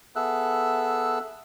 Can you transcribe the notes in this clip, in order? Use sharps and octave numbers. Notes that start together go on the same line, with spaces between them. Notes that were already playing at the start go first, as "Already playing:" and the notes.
B3 G#4 A4 E5 E6 F#6